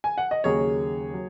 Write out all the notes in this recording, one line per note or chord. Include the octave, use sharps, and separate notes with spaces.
G#5
F#5
D#5
D#2 C#3 F#3 A#3 G#4 C#5
F#3